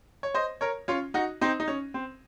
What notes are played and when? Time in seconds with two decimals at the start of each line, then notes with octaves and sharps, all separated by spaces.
0.23 C#5
0.35 C5 D#5
0.61 A#4 C#5
0.88 C#4 F4
1.14 D#4 F#4
1.41 C4 D#4
1.60 D#4
1.68 C#4
1.94 C4